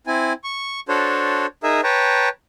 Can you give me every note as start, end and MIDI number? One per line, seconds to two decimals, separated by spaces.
0.07 0.33 60
0.07 0.33 64
0.07 0.33 80
0.44 0.80 85
0.88 1.46 62
0.88 1.46 66
0.88 1.46 69
0.88 1.46 72
0.88 1.46 73
1.63 1.81 63
1.63 1.81 68
1.63 1.81 70
1.63 1.81 76
1.84 2.29 71
1.84 2.29 73
1.84 2.29 79
1.84 2.29 81
1.84 2.29 82